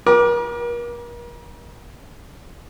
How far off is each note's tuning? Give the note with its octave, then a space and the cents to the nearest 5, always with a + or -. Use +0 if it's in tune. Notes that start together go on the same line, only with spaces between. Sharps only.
A#4 +40 D6 +0